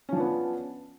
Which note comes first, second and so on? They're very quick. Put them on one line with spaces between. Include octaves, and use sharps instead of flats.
C#4 F3 D4 B3